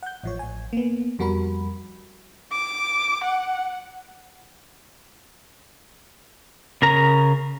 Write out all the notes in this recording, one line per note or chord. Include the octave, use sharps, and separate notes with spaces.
F#5 G6
A1 F3 C#5
A1 G#5
A#3 B3
F2 G3 F#4 A#4 B5
D6
F#5
C#3 A#4 A#5